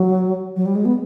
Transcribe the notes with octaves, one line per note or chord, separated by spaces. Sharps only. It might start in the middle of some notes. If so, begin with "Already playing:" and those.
Already playing: F#3
F#3
G3
G#3
B3